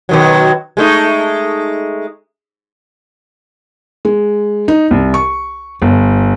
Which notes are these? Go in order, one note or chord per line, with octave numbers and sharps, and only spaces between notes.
B2 D#3 F#3
G#3 A3 D#4
G#3
D#4
C2
C#6
G1